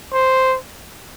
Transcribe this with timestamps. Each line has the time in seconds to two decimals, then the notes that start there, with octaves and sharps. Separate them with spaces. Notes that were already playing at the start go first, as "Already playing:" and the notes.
0.13 C5